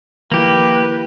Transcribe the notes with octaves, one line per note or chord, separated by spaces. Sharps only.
D#3 F3 A#3 E4 G4 B4